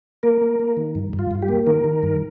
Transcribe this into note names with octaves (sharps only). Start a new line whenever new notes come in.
A#3 A#4
A#3
A#3
D#3
G2
G2
F4
G2
G4
A#3
D#3 A#4
D#3
G2